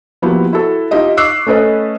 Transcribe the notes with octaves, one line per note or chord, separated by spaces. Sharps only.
F3 A#3 B3 E4 F#4 G4
E4 F#4 A4
D#4 F4 G4 D#5 E5
C#6 D6 E6 F#6 C7
A3 C#4 A4 B4 D#5